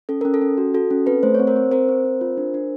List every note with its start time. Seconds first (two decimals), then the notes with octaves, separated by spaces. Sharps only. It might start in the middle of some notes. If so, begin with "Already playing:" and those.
0.09 C#4 A4
0.21 C#4 A#4
0.34 A4
0.41 C#4
0.58 F#4
0.74 F#4 A4
0.91 C#4
1.06 C4 A4 B4
1.23 A3 C5
1.35 C4 C#5
1.47 A#4 C5
1.56 C4
1.72 C4 A#4 C5
1.89 C4
2.05 C4
2.21 F4
2.37 D4
2.54 D4